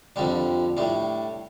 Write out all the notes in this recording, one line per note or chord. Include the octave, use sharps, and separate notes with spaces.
F2 D3 G3 D4
A2 G3 D4